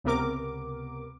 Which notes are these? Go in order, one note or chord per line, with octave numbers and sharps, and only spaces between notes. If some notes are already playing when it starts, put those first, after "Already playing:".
C#2 C3 B3 A#4 D6